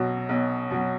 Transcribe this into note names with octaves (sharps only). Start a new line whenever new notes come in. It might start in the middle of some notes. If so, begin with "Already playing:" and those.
Already playing: B1 B2 F#3
B1
B2 F#3